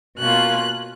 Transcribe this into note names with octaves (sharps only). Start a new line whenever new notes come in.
B2 A#3 C#4 F4 F#6